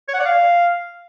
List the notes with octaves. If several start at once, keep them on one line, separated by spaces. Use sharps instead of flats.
C#5
F#5
D5
F5